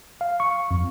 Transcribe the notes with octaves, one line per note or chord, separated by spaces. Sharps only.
F5
C#6
F2